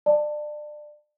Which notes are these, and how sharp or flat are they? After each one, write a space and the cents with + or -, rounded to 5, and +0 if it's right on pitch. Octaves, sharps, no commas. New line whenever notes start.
D5 +25 A5 +15